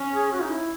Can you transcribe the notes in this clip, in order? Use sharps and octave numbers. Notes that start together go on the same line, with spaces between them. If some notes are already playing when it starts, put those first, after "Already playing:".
Already playing: C#4
G#4
F#4
D#4
E4